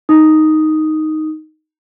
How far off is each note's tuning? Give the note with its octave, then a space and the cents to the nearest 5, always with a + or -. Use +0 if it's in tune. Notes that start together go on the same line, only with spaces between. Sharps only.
D#4 +0 D#6 +0